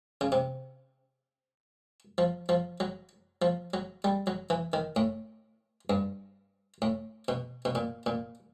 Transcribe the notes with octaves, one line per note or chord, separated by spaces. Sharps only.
C#3
C3
F3
F3
F#3
F3
F#3
G3
F#3
E3
D#3
A2
G2
A2
B2
B2
A#2
A#2